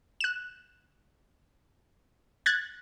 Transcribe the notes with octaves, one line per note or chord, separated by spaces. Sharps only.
F#6 E7
F#6 G#6 A6